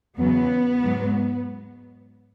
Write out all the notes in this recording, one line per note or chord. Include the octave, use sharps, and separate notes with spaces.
E2 C#3 F#3 B3
G#2 F#3